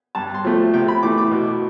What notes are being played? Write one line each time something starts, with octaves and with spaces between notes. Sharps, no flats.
G2 A5
C6
F3 A3
C3 G5
B5
E3 A3 D6
D6
B2 D6